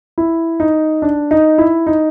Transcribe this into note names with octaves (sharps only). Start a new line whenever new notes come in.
E4
D#4
D4
D#4
E4
D#4